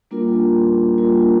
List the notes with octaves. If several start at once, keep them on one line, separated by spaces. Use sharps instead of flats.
G3 A#3 D4 F4 A#4
G3 A#3 D4 F4 A#4